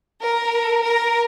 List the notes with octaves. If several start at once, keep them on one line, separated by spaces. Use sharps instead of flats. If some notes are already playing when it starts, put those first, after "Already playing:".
A#4
A#4